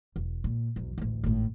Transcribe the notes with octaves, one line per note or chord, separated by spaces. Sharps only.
E1
A#2
B1 E2
A1 D2
G#1 A2